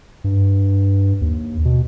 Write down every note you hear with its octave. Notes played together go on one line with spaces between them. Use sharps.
G2
D#2
B2